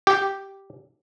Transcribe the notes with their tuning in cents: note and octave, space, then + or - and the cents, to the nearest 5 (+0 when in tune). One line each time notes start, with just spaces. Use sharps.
G4 -5